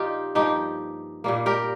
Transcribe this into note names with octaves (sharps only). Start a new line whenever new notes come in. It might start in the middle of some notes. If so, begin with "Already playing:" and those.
Already playing: G2 D#3 G3 D#4 F4 G4
G2 F3 A#3 D#4 G4
A#2 G3 A#3
G4 A#4